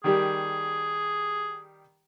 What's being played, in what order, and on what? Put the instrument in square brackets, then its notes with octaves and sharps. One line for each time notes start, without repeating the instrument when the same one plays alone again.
[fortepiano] D#3 G3 G4 [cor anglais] G#4